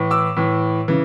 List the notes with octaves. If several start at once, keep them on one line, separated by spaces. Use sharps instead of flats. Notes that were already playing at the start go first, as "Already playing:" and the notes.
Already playing: A2 E3
D6 E6
A2 E3
C#3 E3